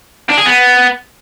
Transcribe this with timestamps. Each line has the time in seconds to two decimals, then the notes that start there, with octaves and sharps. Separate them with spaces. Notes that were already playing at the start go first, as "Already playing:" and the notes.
0.30 D4
0.38 G#4
0.46 B3